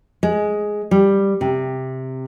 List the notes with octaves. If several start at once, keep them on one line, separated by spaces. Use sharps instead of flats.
G#3
G3
C3